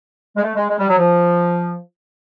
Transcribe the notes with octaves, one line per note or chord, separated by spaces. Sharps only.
G#3
A3
G#3
G#3
G3
F#3
F3